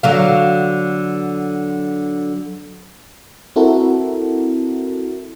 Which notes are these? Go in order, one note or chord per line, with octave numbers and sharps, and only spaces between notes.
D3 F#3 F5
C4 E4 F#4 A4 A#4